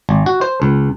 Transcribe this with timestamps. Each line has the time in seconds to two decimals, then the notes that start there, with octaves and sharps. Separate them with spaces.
0.09 G#1
0.26 F#4
0.41 C5
0.62 C#2